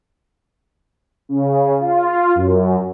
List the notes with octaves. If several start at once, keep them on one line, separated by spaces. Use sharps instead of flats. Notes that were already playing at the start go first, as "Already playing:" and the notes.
C#3
F4
F#2